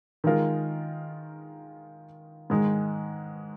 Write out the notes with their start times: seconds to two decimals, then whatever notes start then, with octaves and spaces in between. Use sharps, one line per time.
0.24 D#3 G#3 F4 A#4
2.50 G#2 D#3 G#3